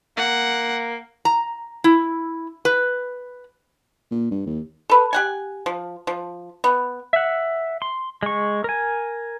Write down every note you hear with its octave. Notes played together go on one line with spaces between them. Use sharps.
A#3 F#5
A#5
E4
B4
A#2
G2
D#2
A4 B4
G4 F#5 G#5
F3
F3
B3
E5 F#5
C6
G#3 C#6
A#4 G#5